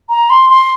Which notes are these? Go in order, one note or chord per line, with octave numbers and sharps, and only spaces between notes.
A#5
C6
C6